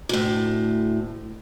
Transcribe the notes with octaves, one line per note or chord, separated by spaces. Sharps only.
D2 A2